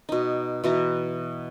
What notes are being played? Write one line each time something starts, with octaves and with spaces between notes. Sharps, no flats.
B2 D#4
B2 E3 A#5